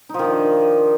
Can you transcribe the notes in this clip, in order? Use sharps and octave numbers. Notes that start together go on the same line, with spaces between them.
D#3 F3 D4 D#4